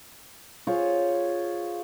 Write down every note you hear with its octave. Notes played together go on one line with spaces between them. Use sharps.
F4 G#4 C5 C#5